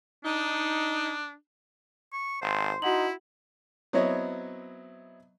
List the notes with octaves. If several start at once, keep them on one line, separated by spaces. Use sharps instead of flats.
D4 D#4
C#6
G#1 C5 C6
D#4 E4 F#4 F#5 F#7
F#3 B3 C4 E4 C#5 D#5